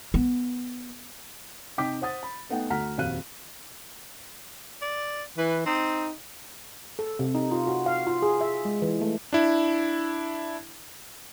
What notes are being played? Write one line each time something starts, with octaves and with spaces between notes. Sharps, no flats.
B3
C3 D#4 G5 D6 G6 B6
C5 F#5 D#6 A6
B5
A3 B3 D#4 F#5 G5
D2 A3 F#5 A#5 F6 B6
D#1 F2 F#3 F5 F#6 D#7
D5
E3 B4
C4 D#4
A4
C3
D#4
F4
F#4
F5
F4
G#4
E5
G#3
E3
A3
D4 E4